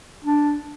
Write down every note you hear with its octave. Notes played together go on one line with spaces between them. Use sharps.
D4